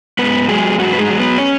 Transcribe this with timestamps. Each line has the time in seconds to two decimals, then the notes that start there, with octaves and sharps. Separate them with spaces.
0.19 G#2 B3 B4
0.48 F#3 G#3 G#4
0.78 G#2 F#3 F#4
0.93 B4
0.98 G#3 G#4
1.09 F#3
1.19 B3 B4
1.38 C#4 C#5